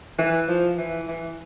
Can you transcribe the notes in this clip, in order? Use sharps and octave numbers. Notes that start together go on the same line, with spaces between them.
E3
F3
E3
E3